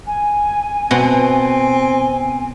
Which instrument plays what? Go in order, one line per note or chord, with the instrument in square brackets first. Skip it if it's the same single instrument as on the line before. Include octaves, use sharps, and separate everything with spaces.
[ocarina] G#5
[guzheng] B2 [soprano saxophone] C4